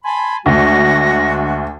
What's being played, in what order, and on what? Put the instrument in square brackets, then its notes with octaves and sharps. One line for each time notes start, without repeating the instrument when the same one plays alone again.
[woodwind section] G#5 A5 B5 [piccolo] C6
[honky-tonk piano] D2 [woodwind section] G#3 F#4 [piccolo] A#6